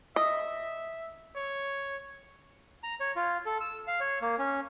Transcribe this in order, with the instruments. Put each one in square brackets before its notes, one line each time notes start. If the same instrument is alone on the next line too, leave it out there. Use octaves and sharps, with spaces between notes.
[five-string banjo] D#5 [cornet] E5
[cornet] C#5
[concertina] A#5
C#5
F4
A4
E6
F5
C#5
A#3
C#4